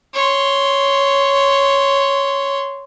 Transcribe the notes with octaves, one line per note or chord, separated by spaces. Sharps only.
C#5 C6